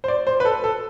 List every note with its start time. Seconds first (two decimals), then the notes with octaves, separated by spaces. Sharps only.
0.04 C5
0.08 D5
0.27 C5
0.40 B4
0.45 A4
0.64 A4